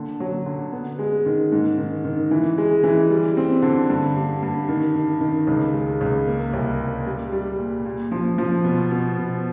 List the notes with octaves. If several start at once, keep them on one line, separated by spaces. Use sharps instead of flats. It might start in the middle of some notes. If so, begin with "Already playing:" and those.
Already playing: A#2 D3
F#3
D3
B3
G#3
D#3
G#2
D#3
D#3
E3
G#3
E3
G3
C4
D3
G2
G2
G2
D#3
D#3
D#3
C#2
G#3
C#2
A#3
C2
A#2
G3
G3
A#2
A#2
F3
F3
B2
B2
B2